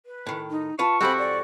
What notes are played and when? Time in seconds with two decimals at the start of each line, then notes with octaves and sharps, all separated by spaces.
0.06 B4
0.27 A2 D#3
0.50 D#4
0.79 F4 B4 F5 A5 C#6
1.01 F2 G#2 C4 F#4 G4 A4 B5
1.18 D5